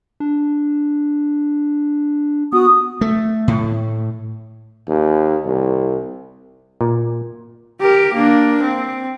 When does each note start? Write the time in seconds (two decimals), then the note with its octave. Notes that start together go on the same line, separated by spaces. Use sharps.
0.20 D4
2.52 B3 F#4 D#6
3.01 A3
3.48 A2
4.88 D#2
5.45 C2
6.81 A#2
7.80 G4 A#4
8.14 A#3 D4
8.62 C4